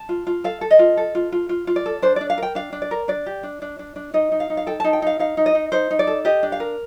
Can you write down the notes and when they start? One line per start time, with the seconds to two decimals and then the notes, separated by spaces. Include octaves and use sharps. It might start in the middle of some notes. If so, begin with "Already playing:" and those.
Already playing: A5
0.09 F4
0.27 F4
0.44 A4 F5
0.61 A4
0.70 D#5
0.79 F4
0.97 A4
1.15 F4
1.32 F4
1.49 F4
1.67 F4
1.76 D5
1.86 A4
2.02 D4 C5
2.16 D5
2.21 D4
2.30 F5
2.38 A#4 G5
2.55 D4 F5
2.73 D4
2.82 D5
2.91 A#4
3.08 D4 D5
3.26 G4
3.43 D4
3.62 D4
3.79 D4
3.96 D4
4.14 D#4 D#5
4.32 D#4
4.40 F5
4.50 D#4
4.57 F5
4.67 A4 G5
4.80 A5
4.84 D#4
4.93 G5
5.02 D#4 F5
5.19 D#4 F5
5.37 D#4
5.46 D#5
5.55 D#4
5.72 D#4 C5
5.91 D#4
5.99 D5
6.07 A4
6.25 G4 D#5
6.43 D4
6.52 F5
6.60 A#4